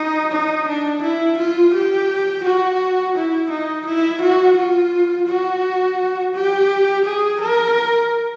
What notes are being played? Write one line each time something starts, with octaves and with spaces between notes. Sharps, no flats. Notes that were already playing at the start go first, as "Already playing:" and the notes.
Already playing: D#4
D#4
D4
E4
F4
G4
F#4
E4
D#4
E4
F#4
F4
F#4
G4
G#4
A#4